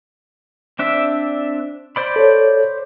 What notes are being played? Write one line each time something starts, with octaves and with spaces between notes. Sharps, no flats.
C4 D4 E5
C5 D5 B5
A4 C#5